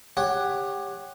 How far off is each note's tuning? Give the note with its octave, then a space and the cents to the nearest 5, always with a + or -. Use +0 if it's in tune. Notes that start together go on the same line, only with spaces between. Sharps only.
G4 +15 C#5 +0 F#5 +0